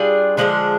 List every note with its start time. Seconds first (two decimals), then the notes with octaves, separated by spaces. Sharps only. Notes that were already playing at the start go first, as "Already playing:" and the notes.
Already playing: G3 D4 F4 G#4
0.37 D3 F3 G#3 D4